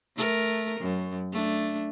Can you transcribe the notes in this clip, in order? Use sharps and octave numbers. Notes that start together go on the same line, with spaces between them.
A3 A#4
F#2
A3 D4